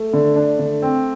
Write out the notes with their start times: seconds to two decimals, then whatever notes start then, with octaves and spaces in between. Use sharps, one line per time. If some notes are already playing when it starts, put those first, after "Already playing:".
Already playing: A3
0.13 D3
0.36 D4
0.59 D3
0.82 C4